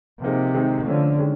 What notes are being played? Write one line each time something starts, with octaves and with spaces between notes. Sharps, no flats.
C3 F3 A#3 D#4 G#4
D#3 G#3 C4 D#4 G#4
D3 F3 A3 C#4 F4
D#3 G#3 C#4